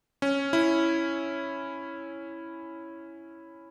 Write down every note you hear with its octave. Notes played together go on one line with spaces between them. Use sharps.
C#4
E4